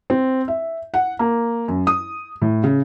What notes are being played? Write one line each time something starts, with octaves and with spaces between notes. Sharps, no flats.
C4
E5
F#5
A#3
F#2
D#6
A2
C#3